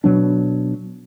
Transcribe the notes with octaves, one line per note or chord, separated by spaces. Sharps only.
B2 F#3 D4